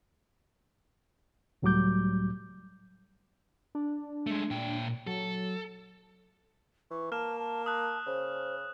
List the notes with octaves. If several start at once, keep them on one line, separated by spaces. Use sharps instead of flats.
C#2 A2 F#3 G3 D6 G6
D4
G#3 A3
A#2 G5
F#3 A4
E3 C#6
A#3 A5 F6 E7
A5
A5 D#6 F#6
C#3 C5